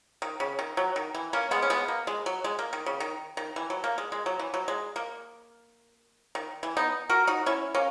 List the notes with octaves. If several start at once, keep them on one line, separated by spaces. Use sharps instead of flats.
D#3
C#3
D#3
F#3
D#3
E3
A#3 C#4
G#3 B3
C#4
G#3 B3
A#3
G#3
F#3
G#3
A#3
D#3
C#3
D#3
D#3
E3
F#3
A#3
G#3
G#3
F#3
E3
F#3
G#3
A#3
D#3
E3
B3 D#4
F#4 A#4
D#4 F#4
C#4 E4
A#3 C#4